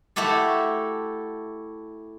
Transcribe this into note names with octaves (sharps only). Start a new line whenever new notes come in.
A3 E4 F#4 G4 A4